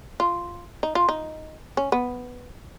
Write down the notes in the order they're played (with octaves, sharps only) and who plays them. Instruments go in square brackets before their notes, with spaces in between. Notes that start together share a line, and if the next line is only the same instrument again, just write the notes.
[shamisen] F4
D#4
F4
D#4
C#4
B3